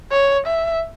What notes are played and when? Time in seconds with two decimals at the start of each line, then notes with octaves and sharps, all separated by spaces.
0.11 C#5
0.46 E5